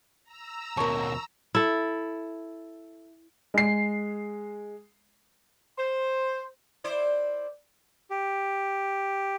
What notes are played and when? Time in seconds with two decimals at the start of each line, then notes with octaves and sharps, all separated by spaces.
0.24 A#5 E6
0.77 D#2 B2 A#4 C#5 A5 C#6
1.55 E4 A4
3.54 G#3 C7
5.78 C5
6.84 E4 C5 D5
8.11 G4